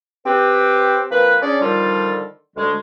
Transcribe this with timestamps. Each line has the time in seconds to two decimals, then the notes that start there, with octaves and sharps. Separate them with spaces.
0.26 C4 G4 B4
1.11 F3 A#3 C4 B4
1.42 C#4 D4 G#4 D5
1.61 D3 D#3 F3 G3 F4 A4
2.56 D2 G#3